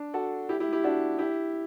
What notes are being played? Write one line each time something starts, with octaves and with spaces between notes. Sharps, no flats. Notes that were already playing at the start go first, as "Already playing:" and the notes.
Already playing: D4
F#4 A4
E4 G4
E4 G4
E4 G4
D4 F#4
E4 G4